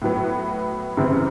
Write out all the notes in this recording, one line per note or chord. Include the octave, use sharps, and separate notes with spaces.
A2 F#3 B3
F#2 C#3 E3 G3 C4